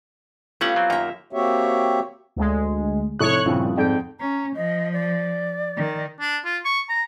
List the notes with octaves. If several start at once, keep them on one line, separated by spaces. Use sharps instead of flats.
A3 B3 C#4 F4 G4 F#5
F#3 C4
F#2 D#3 A#3 E5 A#5
A#3 C4 F#4 G4 C#5 E5
D2 G#3
F1 E4 C#5 C#6 D#6 F#6
G2 A#2 C#3 F3 C4 E4
F2 G#2 D5 G5
C#4 A#5
F3 D#5
D5
D#3
D4
F4
C#6
A#5